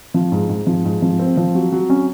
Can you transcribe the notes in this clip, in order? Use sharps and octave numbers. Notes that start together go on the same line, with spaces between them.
F3
G#2
G#2
F3
G#2
F3
C4
F3
F#3
F#3
C#4